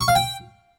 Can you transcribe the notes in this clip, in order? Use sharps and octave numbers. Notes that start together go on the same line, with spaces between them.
C#6
F5
G5